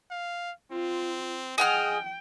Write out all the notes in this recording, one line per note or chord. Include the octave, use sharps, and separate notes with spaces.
F5
C4 F4
G#4 D#5 F#5 G5 F6